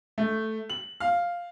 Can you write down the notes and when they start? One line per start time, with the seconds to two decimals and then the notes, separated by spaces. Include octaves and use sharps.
0.18 A3
0.70 F#7
1.00 F5